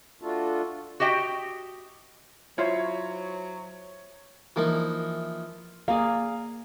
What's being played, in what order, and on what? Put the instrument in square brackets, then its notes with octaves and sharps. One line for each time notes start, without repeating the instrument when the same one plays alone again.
[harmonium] A3 D4 F4 F#4 A4
[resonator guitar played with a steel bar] F#4 G4 D#5 G5
[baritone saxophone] F#3 [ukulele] E4 F4 C5 [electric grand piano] C#5
[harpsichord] E3 F3 A#3 D#4
[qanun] A#3 G#4 D5 [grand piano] F5